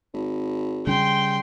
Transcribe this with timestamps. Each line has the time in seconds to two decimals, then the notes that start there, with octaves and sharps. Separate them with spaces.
0.14 G#1
0.87 C#3 G3 C#4 G5 C6